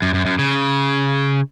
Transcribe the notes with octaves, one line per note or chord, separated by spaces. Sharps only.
F#2
F#2
F#2
C#3